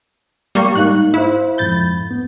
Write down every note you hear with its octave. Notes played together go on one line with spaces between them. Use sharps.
G3 A#3 C#6
G#2 D#4 F5 F#6
E4 C5 F5
F2 G#2 B5 G6 A6
B3